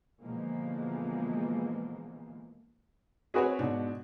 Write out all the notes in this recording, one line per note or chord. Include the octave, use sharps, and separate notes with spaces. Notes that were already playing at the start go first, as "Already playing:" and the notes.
B2 D3 E3 F3 G#3 A#3
C4 F#4 G#4 B4 C#5
G#2 B2 D4